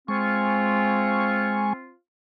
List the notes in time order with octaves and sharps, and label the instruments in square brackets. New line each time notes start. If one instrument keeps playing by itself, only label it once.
[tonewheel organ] G#3 G#5 C#6 [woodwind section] C4 F4